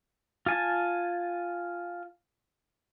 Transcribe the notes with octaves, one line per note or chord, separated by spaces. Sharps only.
F4 G#5 A5